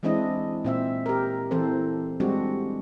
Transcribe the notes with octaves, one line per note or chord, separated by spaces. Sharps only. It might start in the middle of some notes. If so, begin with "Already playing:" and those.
E3 G#3 C4 D4 E4 D#5
A#2 C4 E5
G4 A#4
E3 C4 A4 C5
G3 G#3 C4 D4 F#4 G4